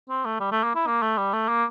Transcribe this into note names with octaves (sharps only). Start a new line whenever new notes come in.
C4
A3
G3
A3
A#3
E4
A#3
A3
G3
A3
A#3